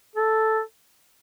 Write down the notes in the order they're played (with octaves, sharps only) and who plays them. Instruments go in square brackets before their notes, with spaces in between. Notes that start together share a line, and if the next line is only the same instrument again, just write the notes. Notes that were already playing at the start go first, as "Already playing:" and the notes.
[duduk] A4